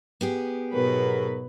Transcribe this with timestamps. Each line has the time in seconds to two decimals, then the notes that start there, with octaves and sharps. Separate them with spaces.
0.21 B3 G4 G#4
0.73 G#2 B2 F#3 A#4 B4